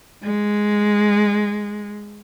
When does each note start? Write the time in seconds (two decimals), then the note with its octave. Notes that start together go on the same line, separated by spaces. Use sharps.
0.23 G#3